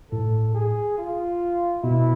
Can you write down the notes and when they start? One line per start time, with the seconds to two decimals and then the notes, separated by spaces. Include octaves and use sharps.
0.12 A2 A4
0.55 G#4
0.98 F4
1.83 B2 E4